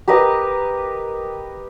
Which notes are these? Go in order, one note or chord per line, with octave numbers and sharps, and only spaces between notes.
G4 A#4 B4 D#5